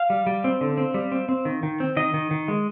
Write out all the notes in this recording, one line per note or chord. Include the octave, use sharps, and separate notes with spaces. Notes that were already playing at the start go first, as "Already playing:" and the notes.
Already playing: F5
G3
G3
C4
D3
C4
G3
C4
C4
D#3
D#3
C4
D#3 D#5
D#3
D#3
G#3